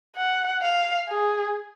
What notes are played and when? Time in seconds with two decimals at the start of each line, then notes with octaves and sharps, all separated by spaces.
0.16 F#5
0.62 F5
1.09 G#4